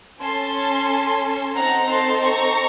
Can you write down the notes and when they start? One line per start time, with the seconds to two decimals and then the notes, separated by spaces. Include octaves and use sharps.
0.20 C#4 A4 A5 C6
1.55 C4 D#4 A4 F#5 A#5
1.89 A5 C6
2.23 A#5 C#6